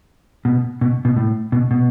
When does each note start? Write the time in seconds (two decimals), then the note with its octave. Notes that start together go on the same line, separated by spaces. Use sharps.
0.45 B2
0.81 B2
1.05 B2
1.16 A2
1.52 B2
1.71 B2